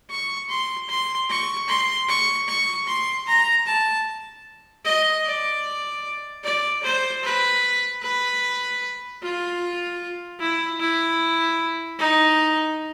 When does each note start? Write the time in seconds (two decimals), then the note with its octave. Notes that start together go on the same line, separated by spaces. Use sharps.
0.10 C#6
0.50 C6
0.89 C6
1.29 C#6
1.69 C6
2.09 C#6
2.48 C#6
2.88 C6
3.27 A#5
3.67 A5
4.85 D#5
5.25 D5
6.44 D5
6.83 C5
7.23 B4
8.03 B4
9.22 F4
10.40 E4
10.80 E4
11.99 D#4